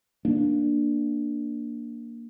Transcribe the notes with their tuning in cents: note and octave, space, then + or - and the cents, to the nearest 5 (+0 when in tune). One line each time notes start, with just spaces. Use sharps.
A#3 +0 D4 +0